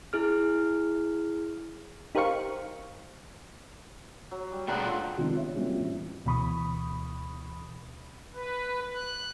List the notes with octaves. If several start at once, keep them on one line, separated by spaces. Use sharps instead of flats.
E4 G#4 F6
D#4 G4 A#4 C5 F5 C#6
F#3
G3
A3 D4 G#4 B4 F#5 G5 A#5 F#6
F4 A4
C3 D#3 F3 G#3 B3 D4
C#5 E5
F#3 G3 A#3 C4 C#4 F4
A1
D2 B2 E3 B5 C#6 D#6
B4
F#6